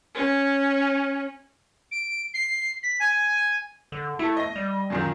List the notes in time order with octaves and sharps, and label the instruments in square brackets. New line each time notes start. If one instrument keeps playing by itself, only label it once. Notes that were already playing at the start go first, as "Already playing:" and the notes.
[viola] C#4
[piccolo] D7
C7
B6
G#5
[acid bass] D3
[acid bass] A3 [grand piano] E4 A4
[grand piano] D#5 A#6
[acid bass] G3
[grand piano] F#2 A#2 D#3